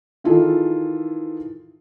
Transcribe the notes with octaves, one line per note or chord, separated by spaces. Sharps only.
D#3 E3 F4 G#4 A4